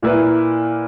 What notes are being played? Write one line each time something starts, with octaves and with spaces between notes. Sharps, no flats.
A#2 A#3 E4 B4